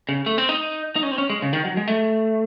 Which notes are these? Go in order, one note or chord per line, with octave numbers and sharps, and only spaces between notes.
C#3
A3
C4
D#4
D#4
C#4
C4
C#4
G#3
C#3
D#3
F#3
G#3
A3